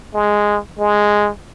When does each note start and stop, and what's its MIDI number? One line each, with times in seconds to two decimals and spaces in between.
0.15 0.59 56
0.79 1.30 56